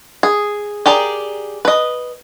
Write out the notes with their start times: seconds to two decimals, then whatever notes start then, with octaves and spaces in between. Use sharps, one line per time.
0.23 G#4
0.86 G4 G#4 A#4 D5
1.65 B4 D#5